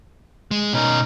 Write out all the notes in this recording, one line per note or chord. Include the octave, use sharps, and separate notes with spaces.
G#3
B2 C#4 D#4 A#4